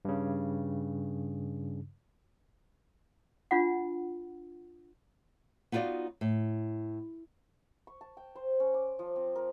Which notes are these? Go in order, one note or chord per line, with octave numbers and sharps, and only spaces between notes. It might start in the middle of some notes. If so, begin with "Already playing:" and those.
G2 C#3
D4 F4 F#5
B3 D#4 F4 F#4 D5 F5
A2
C#6
A5
G5
C5
C#4
D6
F3
C4
A#4